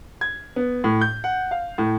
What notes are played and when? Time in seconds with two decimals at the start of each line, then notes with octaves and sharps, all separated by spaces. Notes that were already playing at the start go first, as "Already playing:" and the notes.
0.21 G#6
0.56 B3
0.84 A2
1.01 G6
1.24 F#5
1.51 F5
1.78 A2